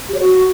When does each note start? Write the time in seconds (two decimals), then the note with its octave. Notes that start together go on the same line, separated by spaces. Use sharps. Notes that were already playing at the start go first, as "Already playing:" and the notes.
0.09 G4
0.15 C#5
0.20 F#4